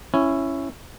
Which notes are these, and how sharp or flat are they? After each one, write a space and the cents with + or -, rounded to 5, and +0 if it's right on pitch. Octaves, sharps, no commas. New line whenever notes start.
C#4 -5 E4 +10